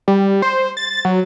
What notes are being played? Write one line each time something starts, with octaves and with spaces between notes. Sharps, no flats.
G3
C5
A6
F#3